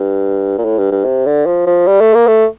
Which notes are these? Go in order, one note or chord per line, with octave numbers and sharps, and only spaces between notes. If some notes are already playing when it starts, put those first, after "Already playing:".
Already playing: G2
A#2
A2
G2
G2
C3
D3
F3
F3
G3
A3
A#3
A3